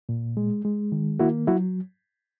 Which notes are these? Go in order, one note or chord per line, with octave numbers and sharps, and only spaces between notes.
A#2
G#3
G#3
D#3
A#3 E4 F#4
F#3 E4 F#4